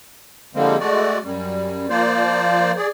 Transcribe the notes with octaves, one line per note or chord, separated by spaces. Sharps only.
D3 F3 G3 G#3 A#3 C4
G#3 A3 F#4 D5
F#2 G3
F3 A#3 F4 C5 D5
G#4 D5